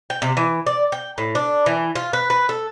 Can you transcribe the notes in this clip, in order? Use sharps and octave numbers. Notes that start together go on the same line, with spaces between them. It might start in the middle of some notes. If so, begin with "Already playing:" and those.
G5
C3
E3
D5
G5
A2
D4
E3
F4
B4
B4
A4